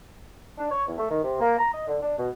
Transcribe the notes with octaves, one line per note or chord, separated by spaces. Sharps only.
D4
C#5
E2
A3
D#3
C3
A#3
A#5
D#5
D3
D4
B2